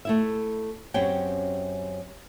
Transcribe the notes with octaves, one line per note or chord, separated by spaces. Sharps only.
A3 E4 E5
F#2 C4 C#4 G4 C#5 G5